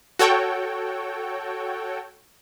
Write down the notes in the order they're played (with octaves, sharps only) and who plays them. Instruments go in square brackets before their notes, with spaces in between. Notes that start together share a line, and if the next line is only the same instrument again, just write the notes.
[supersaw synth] F#4 A4 C#5 G5